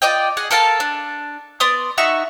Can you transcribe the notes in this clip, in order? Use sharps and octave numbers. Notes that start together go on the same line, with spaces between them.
F4 D5 D#5 G5
G#4 D#5 F#5
A4 A#4 F5 A5
D4
B3 D5 C6 D#6
D#4 F#4 E5 C#6